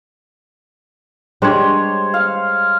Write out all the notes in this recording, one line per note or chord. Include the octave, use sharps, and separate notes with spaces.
G3 G#3 D4 C5 C#5
F5